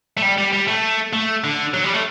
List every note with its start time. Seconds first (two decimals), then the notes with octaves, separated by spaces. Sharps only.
0.17 A3
0.22 G3
0.38 G3
0.53 G3
0.68 A3
1.13 A3
1.44 D3
1.74 F#3
1.84 G3
1.94 A3